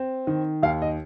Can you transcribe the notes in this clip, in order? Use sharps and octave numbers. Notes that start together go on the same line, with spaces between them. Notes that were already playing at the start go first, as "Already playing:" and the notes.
Already playing: C4
D#3
D#2 F5
D#5